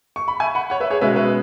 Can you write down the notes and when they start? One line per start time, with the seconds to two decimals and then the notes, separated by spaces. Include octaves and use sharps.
0.16 C#6
0.28 B5
0.40 E5 G#5
0.55 F#5 B5
0.70 C#5 F#5
0.80 B4 E5
0.90 G#4 C#5
1.01 B2 G#3 C#4 B4 E5
1.16 B4 E5